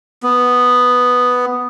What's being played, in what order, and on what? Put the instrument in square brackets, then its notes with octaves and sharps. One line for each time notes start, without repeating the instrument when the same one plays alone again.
[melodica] B3